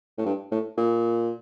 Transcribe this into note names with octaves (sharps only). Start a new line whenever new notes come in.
A2
G2
A2
A#2